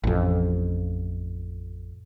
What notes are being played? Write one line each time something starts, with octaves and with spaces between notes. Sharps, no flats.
A1 F2